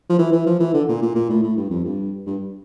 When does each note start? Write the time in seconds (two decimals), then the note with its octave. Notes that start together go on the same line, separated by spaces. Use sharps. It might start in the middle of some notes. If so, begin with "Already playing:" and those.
0.10 F3
0.18 E3
0.32 E3
0.46 F3
0.60 E3
0.73 D3
0.88 A#2
1.02 A#2
1.15 A#2
1.30 A2
1.43 A2
1.57 G2
1.70 F2
1.84 G2
2.26 G2